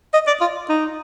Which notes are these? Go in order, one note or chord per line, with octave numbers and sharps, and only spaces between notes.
D#5
D5
F4
D#4